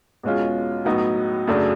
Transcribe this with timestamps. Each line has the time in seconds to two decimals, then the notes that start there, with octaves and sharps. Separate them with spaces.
0.23 E2 B2 G#3 C#4 F4
0.85 A2 F#3 B3 D#4 F#4
1.47 F#2 C#3 F#3 A3 D4